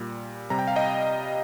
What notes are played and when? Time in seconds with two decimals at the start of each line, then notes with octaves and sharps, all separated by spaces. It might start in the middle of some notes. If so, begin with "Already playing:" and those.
Already playing: A#2 G3
0.50 C3 G3 A#5
0.59 G5
0.68 F5
0.76 D#5 G5